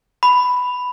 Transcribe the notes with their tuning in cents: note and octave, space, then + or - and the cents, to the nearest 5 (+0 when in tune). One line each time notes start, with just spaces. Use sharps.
B5 +5